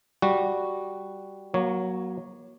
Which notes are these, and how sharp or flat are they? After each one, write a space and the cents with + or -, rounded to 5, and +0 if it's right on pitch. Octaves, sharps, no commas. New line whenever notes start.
G3 +0 F#4 +0
F#3 +0 A#3 +30 C#5 +0